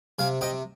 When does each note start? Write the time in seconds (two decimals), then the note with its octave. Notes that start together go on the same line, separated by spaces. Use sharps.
0.19 C3 F5 G#5
0.41 C3 D#5 G5